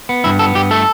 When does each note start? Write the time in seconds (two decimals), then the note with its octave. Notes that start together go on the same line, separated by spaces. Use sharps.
0.09 B3
0.24 G2 E4
0.39 B3 A4
0.55 G2 G4
0.71 A3 A4